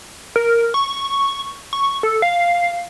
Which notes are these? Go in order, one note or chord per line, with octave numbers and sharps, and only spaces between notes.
A#4
C#6
C#6
A4
F5